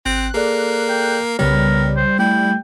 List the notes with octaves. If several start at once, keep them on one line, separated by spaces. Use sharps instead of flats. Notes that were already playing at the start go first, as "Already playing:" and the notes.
G#1 C4 F#6
A#3 G#4 A4 D5
G5
C2 C#3 G3 B3 A#4 C#5
C5
A3 E4 G5